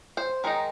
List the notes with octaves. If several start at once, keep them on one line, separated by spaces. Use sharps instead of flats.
C5
D#3 G#3 D#4